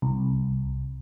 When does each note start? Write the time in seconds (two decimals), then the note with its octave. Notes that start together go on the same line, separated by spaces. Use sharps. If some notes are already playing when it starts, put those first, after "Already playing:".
0.02 C2